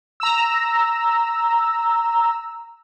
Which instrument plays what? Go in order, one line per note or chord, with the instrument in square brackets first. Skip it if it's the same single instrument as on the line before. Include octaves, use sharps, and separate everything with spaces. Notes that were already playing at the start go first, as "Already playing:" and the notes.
[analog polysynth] A#5 E6